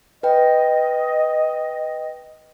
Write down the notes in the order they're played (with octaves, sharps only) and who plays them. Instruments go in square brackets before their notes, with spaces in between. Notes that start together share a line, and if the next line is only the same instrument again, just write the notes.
[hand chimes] B4 G5 [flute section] D#5